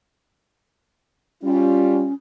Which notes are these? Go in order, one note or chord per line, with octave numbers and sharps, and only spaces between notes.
G3 C#4 F4